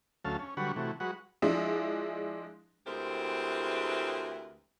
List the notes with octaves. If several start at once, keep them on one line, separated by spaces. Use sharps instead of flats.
D2 F#3 A3 C#4 F5 A5
C#4
D3 F#3 G3 B4 F#5 C#6
C3 E3 A3 F#4
F#3 G#3 F#4 B4 F#5
F3 G#3 D4 E4
D2 E3 G#3 C4 G4 A#4